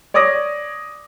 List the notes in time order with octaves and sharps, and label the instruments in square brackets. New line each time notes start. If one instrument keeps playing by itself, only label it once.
[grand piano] C#5 D5 D6 D#6 A#6